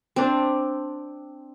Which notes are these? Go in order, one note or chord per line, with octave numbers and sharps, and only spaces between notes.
C4 D4